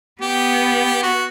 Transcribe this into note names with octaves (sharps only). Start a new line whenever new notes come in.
B3 G4
F#4